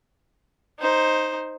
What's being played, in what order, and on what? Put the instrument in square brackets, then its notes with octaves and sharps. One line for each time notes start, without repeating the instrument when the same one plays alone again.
[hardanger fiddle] D#4 C5